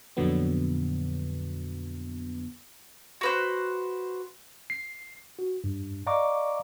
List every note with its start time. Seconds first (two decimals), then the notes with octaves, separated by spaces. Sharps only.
0.17 F2 A#2 D3 F#3 B3
3.21 F#4 B4 C5
4.70 C7
5.39 F#4
5.64 G2
6.07 D5 D#5 F5 A#5 C#6 D6